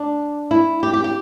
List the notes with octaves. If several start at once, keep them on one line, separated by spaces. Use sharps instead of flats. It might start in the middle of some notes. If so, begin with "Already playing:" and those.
Already playing: D4
E4
G4
G4
G4